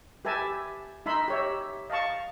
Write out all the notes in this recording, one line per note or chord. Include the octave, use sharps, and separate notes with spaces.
G4 B4 E5 G#5 A5
D#4 E5 B5 C6
G4 C#5 E5
D#5 F5 A5 C#6